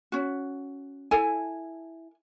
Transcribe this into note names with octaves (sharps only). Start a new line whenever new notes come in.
C#4 F#4
E4 A4 G#5